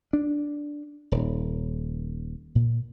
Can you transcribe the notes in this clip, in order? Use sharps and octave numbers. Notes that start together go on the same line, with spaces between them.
D4
D#1
A#2